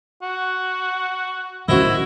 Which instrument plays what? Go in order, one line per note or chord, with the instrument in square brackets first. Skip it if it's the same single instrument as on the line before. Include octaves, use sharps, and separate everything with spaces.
[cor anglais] F#4
[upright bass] D#3 C#4 [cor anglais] E4 [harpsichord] F#4 C5 D#5